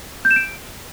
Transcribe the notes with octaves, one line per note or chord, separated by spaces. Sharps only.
G6
E7
D7